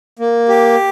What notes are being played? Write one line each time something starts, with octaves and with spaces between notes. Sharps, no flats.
A#3
G4